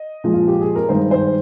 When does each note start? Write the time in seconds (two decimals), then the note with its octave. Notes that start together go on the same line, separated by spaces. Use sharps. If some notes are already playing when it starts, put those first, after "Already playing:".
Already playing: D#5
0.24 A#2 F3 G#3
0.34 F4
0.48 G4
0.61 G#4
0.76 A#4
0.89 G2 D#3 G#3 C5
1.11 C5